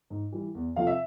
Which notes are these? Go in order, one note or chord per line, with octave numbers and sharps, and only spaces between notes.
G#2
E3 G3
E2
C3 F3 A3 F5
E5